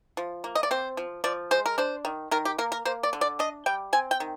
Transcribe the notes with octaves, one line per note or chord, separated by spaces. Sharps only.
F3
A#3
D#5
D5
C4 C5
F3
F3 D5
G#3 C5
A#4
D4 C5
D#3
D#3 A#4
G4
A#3 A#4
A#4
A#3 C5
D5
D3
D5
D4 D#5
G3 G5
C4 G#5
G5
D#3